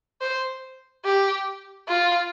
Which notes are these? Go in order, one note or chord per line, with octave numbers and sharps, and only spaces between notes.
C5
G4
F4